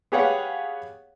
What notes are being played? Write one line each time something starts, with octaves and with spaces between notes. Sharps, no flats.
B3 G4 G#4 C#5 F5 F#5